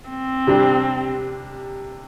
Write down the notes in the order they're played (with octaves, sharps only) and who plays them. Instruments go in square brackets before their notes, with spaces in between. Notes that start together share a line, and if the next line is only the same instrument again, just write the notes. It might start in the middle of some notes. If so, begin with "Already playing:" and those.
[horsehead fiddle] C4
[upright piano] C3 G3 D4